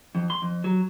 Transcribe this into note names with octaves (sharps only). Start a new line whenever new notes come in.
F2
C6
F2
F#3